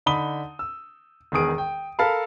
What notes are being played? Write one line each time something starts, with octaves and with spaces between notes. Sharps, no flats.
D3 D#4 B5 D#6 G7
E6
E1 D#3 B3 G#4 D#6 D7
G5
A4 A#4 F5 A5 B5